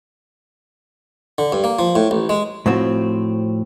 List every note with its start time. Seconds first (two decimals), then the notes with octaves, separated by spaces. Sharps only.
1.38 D3
1.52 G2
1.64 A#3
1.79 F3
1.96 A2
2.11 A1
2.29 G#3
2.66 A2 F3 C4 F#4